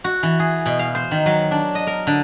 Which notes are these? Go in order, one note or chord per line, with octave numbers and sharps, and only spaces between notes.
F#4
E3
G#4
B2
F5
C5
D#3
F#3
D4
D#5
A#4
D3